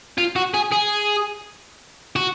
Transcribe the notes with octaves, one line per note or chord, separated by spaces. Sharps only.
F4
F#4
G#4
G#4
F#4